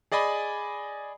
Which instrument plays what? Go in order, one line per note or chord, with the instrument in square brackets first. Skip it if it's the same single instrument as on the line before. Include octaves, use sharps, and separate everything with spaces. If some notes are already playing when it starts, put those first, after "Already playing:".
[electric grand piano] G#4 D5 D#5 G#5 B5